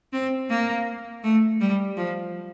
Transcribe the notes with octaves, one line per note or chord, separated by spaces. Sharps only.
C4
A#3
A3
G3
F3